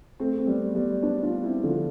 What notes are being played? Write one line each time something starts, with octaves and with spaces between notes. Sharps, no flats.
A3 C4
C4
G3 B3
G3 B3
B3 D4
D4 F4
C4 E4
D3 F3